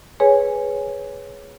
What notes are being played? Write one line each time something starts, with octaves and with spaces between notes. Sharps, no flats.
G#4 B4 C#5 G#5